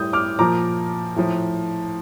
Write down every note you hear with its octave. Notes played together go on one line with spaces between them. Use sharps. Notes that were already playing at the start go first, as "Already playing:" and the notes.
Already playing: A2 G3 D#6 G6
D6 F6
A#2 F3 A#5 D6
A2 F3